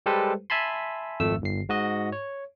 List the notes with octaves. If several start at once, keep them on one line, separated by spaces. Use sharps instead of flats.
G3 G#3 G4 A4 B4 C5
E5 G#5 A5 B5 C6
G#1 F2 A3 E6
G1 C7
G#2 F#4 D#5
C#5